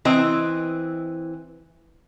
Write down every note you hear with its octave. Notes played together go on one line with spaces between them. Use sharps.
E3 C4 E4 D#5